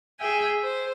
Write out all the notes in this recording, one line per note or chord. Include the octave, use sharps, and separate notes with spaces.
G#4 E5 G5 G#5
C5